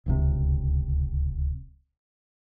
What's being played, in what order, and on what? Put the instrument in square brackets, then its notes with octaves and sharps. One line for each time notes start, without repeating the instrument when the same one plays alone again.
[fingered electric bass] D1 C#2 C3